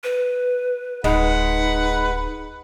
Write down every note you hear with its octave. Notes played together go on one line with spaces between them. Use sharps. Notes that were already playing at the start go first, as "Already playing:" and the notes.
B4
D1 G#3 D#4 B4 F#5